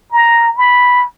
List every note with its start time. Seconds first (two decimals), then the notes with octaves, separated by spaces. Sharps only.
0.12 A#5
0.57 B5